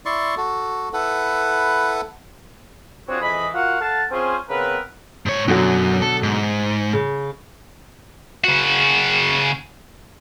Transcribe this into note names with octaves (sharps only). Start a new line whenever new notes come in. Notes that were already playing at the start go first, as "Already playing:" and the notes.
E4 D5 C6 C#6
F#4 A4
E4 A4 B4 F#5
C4 D4 F4 F#4 G#4 C#5
F2 E3 G#4 D#5 B5
F4 F#4 A#4 F5 F#5
A4 F5 F#5 A5
C4 C#4 F4 G#4 C5
C#3 B3 C4 A#4 B4
G#2 C#5
F#2 B2 D3 F#3
A4
G#2
C#3
C#3 F#4